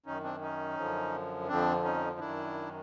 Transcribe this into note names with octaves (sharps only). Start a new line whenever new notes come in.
F#2 D#3 C#4 D#4
C4 D4
C#4 D#4
F#2 D3 F3
F2 D3 F3 C4 D4
C#4 D#4
F#2 D#3 D4 E4